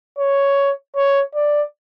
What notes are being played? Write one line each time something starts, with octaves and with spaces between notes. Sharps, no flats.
C#5
C#5
D5